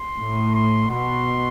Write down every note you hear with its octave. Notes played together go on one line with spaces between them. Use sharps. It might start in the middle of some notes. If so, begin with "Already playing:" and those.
Already playing: C6
A2
C6
B2 C6